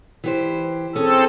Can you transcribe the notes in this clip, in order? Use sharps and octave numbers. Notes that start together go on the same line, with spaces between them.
E3 G4 C5
C4 C#4 G#4 A4 A5